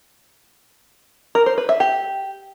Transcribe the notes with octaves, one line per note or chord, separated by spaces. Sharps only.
A#4
C5
B4
E5
G4